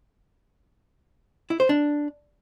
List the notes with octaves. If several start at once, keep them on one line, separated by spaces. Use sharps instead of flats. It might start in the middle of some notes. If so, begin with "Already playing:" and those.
E4
C5
D4